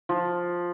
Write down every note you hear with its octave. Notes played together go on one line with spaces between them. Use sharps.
F3